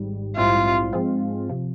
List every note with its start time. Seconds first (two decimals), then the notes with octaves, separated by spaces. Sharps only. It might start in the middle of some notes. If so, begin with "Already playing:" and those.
Already playing: G#1 G#2 G3
0.37 A#1 G#2 G3 C4 E4 F4
0.93 G#2 F3 G#3 C4 F4
1.49 C3 F3